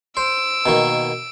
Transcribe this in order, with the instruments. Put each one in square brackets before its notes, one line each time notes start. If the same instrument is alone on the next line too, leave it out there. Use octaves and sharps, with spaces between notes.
[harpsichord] C5 [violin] E6 D7
[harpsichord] B2 D#3 A#3